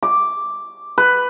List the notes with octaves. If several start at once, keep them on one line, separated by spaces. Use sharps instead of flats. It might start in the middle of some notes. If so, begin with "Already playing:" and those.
D6
B4